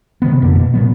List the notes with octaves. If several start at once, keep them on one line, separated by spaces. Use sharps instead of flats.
C3 D#3 B3
F2 D3 A#3
B2
A#2 F#3 B3